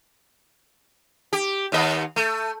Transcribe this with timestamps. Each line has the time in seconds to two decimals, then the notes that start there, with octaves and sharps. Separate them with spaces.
1.33 G4
1.72 D#2 B3 D#5
2.16 A3